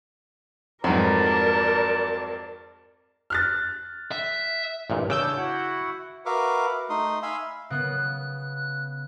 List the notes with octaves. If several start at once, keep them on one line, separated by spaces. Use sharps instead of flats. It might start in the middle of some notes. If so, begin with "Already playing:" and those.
F2 G#2 F#3 G3 B3 A#4 D5 A5
F6 F#6 A6
E5
A1 G2 A#2
E2 C#3 D4 C#5 D6 E6 G6
E4 F#4 F#5
F#4 A#4 B4 E5 F5 D6
A3 D#4 C6 D#6
E5 F5 G#5 B5 C6 E6
C#3 B3 F#6